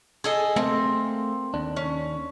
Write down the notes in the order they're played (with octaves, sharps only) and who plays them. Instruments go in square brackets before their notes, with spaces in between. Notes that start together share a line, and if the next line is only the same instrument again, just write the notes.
[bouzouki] G#4 A4 D#5
[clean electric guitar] A3 A#3 A4 [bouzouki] C4
[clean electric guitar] D#2 D4
[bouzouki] C#4